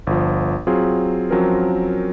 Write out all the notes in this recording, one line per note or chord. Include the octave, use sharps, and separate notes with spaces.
G1 F3
F#3 C4 F4 G#4
F3 F#3 C4 C#4 A#4